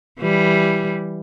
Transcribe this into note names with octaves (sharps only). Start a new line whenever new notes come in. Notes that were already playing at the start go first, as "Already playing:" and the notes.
E3 G3